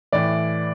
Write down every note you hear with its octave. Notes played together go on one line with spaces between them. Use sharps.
A2 E3 D5